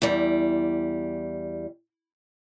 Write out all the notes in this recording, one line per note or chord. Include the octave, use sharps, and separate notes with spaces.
E2 G3